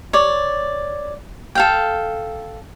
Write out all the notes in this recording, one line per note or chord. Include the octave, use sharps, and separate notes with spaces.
C#5 D5
A4 F5 G5